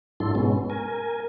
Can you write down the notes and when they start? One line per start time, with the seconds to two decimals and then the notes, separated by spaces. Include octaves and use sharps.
0.20 G#2 F#3 D4 E4 A4 C6
0.35 G#2 B2 G#3 B3 C#4
0.70 A#4 G#5